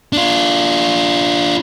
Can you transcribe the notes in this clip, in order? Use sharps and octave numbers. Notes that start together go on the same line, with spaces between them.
D4 F4